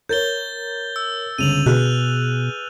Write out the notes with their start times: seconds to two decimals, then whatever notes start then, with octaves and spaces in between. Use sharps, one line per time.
0.09 A#4 C#5 G6 A6 G7
0.96 E6
1.38 G1 C#2 D#7 F7 F#7
1.66 B2 G#4 B4 F6 F#6